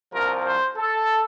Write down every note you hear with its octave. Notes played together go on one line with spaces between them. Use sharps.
C2 C3 F3 A#4
C5
A4